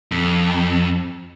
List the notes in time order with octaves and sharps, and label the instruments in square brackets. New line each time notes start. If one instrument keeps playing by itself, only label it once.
[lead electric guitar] F2